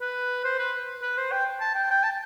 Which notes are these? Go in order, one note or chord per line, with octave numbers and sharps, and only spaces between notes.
B4
C5
B4
B4
C5
G5
A5
G5
G5
A5